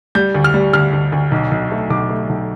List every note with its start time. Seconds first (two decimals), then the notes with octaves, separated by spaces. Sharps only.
0.15 G3 G6
0.34 D2
0.44 F6
0.54 G3
0.73 D2 F6
0.93 D2
1.12 D2
1.31 B1
1.51 B1
1.71 A3
1.90 B1 D6
2.09 A3
2.29 B1